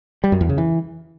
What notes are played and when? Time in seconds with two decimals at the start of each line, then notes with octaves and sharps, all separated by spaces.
0.24 G3
0.32 F#2
0.41 E2
0.49 C#3
0.58 E3